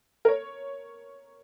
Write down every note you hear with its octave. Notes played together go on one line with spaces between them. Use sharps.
A#4
C#5